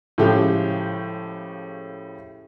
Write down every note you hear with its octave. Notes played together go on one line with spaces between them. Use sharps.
A2 C#3 F3 G#3 A3 G4